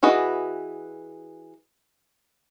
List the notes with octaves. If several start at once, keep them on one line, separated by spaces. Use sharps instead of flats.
E3 F#4 G#4 B4 D#5